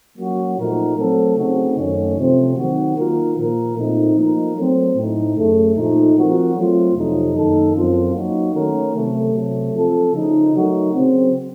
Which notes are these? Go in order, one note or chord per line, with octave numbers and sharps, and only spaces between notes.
F#3 A#3 C#4 F#4
A#2 F3 A3 D#4 A#4
F#3 A3 C4 F#4 A4
C#3 A3 C4 D#4 F#4
F#2 D#3 A3 C#4
C3 F3 A3 C4
D#3 F#3 C4 F#4
D#3 A#3 F4 A#4
A#2 F3 A#3 F4 A#4
A#2 A3 C4 D#4
F3 A#3 D#4 A#4
F#3 A3 C4
A2 A3 D#4
F#2 C#3 A3
A#2 F3 A3 D#4
F3 C4 F#4 A#4
F#3 A3 C4 F4
F2 C3 F#3 A3 D#4
F#2 D#3 A#3 D#4 A4
F#2 F3 C4 F4
F#3 A#3 D#4 F#4
D#3 A3 C#4 F#4 A#4
C3 F#3 A3
C3 F#3 A3
F3 C4 F4 A4
C#3 F3 A3 D#4
F#3 A3 D#4 F#4 A#4
C#3 F#3 C4